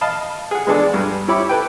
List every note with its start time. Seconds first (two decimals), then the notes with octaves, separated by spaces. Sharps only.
0.01 D#5 F5 A5 B5
0.51 G#4 F#5
0.67 G#3 B3 D4 G#4 A4 D5
0.94 G2
1.28 E4 G4 C#5 B5 D6 E6
1.49 A4 B4 G5